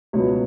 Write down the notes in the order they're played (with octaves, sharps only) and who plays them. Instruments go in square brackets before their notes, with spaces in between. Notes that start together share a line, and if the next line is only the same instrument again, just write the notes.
[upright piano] C#2 B2 F#3 B3 C#5